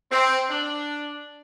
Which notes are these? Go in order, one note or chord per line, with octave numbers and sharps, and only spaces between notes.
C4
D4